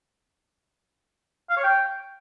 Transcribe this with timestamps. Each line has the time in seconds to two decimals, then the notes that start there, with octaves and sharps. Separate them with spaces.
1.50 F5
1.57 C#5
1.64 G5